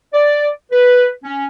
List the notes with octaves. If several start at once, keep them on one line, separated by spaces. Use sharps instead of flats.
D5
B4
C#4